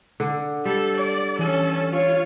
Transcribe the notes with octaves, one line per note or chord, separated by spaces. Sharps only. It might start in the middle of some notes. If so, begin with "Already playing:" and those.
D3
G3 A4
D5
E3 C#4 A4
F4 C#5